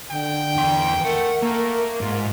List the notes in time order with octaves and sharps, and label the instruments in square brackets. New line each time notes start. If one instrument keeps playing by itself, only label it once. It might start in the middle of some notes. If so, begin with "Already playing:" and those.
[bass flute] D3 [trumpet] G5
[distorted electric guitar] E2 C6
[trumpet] A3 [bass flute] A#4 [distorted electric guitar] F#5
[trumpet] A3 [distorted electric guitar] A#3
[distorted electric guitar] G#2 [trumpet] F4